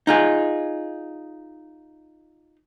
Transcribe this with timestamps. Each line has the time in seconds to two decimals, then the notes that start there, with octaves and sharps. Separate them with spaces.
0.07 D#4 F4 G#4